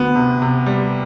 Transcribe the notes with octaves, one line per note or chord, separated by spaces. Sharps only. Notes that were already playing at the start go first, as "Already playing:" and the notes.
Already playing: D2 B3
C3
C3
G3